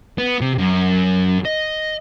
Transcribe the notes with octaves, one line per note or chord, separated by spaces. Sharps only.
B3
C3
F#2
D#5